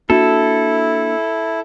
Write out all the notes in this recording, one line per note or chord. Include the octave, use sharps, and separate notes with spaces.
A#3 D4 E4 F#4 A4